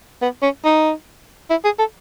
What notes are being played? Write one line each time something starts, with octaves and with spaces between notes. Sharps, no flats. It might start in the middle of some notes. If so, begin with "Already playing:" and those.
B3
C#4
D#4
E4
G#4
A4